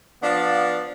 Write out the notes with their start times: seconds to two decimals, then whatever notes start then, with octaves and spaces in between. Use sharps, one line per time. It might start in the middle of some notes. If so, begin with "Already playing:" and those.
0.22 F3 B3 D4 D5 F5